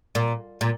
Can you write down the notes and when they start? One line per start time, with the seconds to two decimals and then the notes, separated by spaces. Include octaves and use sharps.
0.15 A#2
0.61 A#2